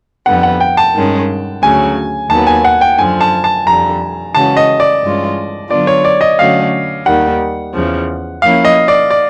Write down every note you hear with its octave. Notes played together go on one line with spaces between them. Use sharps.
F2 D3 G3 B3 F#5
F#5
G5
A5
G2 D#3 G#3 C#4
D2 C#3 F#3 G#5
D#2 D#3 F#3 B3 A5
G#5
F#5
G5
F#2 D3 F3 G#5
A5
A5
F2 D3 G3 A#5
C#3 E3 G#3 C#4 F#4 A5
D#5
D5
G2 E3 G#3 C#4 F4
D3 F#3 B3 D4 F4 D5
C#5
D5
D#5
D3 F#3 A3 C#4 F#4 F5
D#2 D#3 G3 F#5
E2 C#3 F3
F3 A#3 C#4 E4 F5
D#5
D5
D5